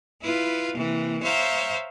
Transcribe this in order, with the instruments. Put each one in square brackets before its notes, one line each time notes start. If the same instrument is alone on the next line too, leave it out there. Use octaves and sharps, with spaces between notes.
[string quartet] E4 F4 B4
C3 E3 A#3
C5 C#5 E5 F5 G5 A#5